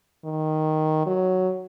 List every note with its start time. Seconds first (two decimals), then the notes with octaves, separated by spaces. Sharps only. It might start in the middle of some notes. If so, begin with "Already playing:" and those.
0.25 D#3
1.06 F#3